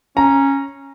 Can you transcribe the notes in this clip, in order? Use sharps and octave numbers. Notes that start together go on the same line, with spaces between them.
C#4 A#5